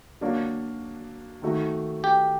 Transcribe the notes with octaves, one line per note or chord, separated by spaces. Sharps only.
F#3 A#3 D4 F#4
D#3 A3 D#4 F#4
G4